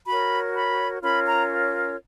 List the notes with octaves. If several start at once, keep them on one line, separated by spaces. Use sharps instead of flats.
F#4 A#4 C#5 B5
B5
C#4 F4 A#4 C#5 B5
A#5